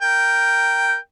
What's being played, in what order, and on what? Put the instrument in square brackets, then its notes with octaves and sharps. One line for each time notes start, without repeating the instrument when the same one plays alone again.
[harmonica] A#4 G5